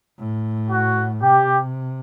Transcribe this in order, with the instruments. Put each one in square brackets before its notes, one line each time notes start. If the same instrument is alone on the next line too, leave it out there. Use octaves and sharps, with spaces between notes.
[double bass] A2
[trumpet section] F#4
[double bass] C3 [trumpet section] G4